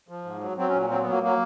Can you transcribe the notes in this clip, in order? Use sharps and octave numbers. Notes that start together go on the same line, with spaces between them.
F3
G#2
F#3
F#3 C4
C#4
A#2
F#3 C4
F#3 B3
A#3
F#3 A#3